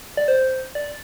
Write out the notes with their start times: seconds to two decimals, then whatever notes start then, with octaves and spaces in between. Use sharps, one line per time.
0.17 D5
0.28 C5
0.75 D5